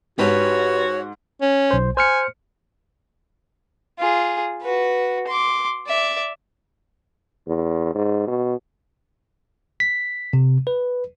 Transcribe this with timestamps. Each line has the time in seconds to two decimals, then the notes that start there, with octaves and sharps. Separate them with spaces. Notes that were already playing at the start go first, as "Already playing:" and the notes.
0.19 G#2 F#4 G4 B4 C#5
1.41 C#4
1.71 B1 C5
1.97 C5 G#5 F6 C#7
3.99 F4 G#4
4.62 F#4 B4
5.27 C6 D6
5.87 D5 E5
7.47 E2
7.95 G#2
8.28 B2
9.80 B6
10.33 C3
10.67 B4